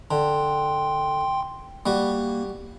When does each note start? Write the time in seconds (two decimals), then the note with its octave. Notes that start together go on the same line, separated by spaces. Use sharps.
0.11 D3 G5 C6
1.86 G3 A#3 F#4